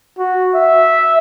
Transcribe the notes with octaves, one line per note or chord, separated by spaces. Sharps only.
F#4
E5